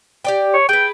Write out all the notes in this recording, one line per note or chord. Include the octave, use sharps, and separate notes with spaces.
G4 D5 G5
C#5
G#4 B4 G5